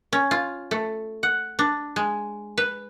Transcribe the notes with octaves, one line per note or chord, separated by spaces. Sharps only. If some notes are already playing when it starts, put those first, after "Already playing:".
C#4
F4
A3
F#5
D4
G#3
B4